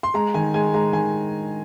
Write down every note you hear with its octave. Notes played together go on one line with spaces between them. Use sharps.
C6
G#3 A#5
D#3 G#5
G#3 G#5
G#3 A#5
D#3 G#5